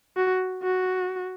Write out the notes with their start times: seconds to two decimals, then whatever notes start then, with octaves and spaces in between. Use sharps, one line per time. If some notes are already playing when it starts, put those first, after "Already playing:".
0.17 F#4
0.63 F#4